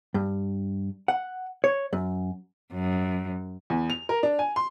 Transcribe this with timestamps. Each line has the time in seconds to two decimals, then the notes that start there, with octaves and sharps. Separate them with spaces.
0.14 G2
1.08 F#5
1.64 C#5
1.93 F#2
2.74 F#2
3.70 E2
3.90 F7
4.09 A#4
4.23 D4
4.39 G#5
4.56 C6